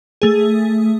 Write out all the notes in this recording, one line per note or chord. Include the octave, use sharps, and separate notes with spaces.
A3 G#4